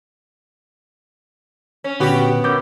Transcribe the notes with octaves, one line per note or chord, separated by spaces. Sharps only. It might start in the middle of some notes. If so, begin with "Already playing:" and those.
C#4
A#2 D3 B3 F#4 G4
F#2 D6 G6